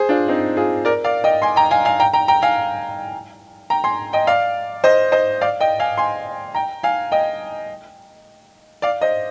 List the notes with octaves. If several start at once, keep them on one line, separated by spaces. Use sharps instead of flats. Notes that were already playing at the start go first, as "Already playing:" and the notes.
Already playing: G#4 C5
D4 F4
C4 D#4
F4 G#4
A#4 D5
D5 F5
D#5 G5
G#5 C6
G5 A#5
F5 G#5
F5 G#5
G5 A#5
G5 A#5
G5 A#5
F5 G#5
G5 A#5
G#5 C6
D#5 G5
D5 F5
C5 D#5
C5 D#5
D5 F5
D#5 G5
F5 G#5
G#5 C6
G5 A#5
F5 G#5
D#5 G5
D5 F5
C5 D#5